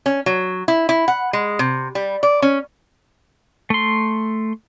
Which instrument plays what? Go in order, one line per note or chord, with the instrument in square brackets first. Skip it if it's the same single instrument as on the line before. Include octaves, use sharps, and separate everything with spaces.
[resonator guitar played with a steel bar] C#4
F#3
E4
E4
F#5
G#3
C3
G3
D5
C#4
[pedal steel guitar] A3 C6